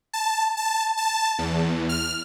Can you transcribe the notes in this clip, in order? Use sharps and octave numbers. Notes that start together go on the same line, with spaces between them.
A5
A5
A5
E2
F6